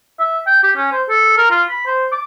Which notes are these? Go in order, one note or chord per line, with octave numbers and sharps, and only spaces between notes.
E5
G5
G4
C#4
C5
A4
A#4
F4
B5
C5
D6